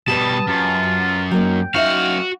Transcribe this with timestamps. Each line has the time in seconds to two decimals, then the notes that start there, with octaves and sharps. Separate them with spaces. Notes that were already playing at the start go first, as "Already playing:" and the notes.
0.08 B2 G3 G4 B4 A5 D#6
0.47 F#2 F4
1.31 F#3 A#3 D#4 G5
1.75 F#2 D#4 F#4 E5 F5